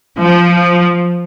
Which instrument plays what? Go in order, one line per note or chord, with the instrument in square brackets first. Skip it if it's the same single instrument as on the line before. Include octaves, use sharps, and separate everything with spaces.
[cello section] F3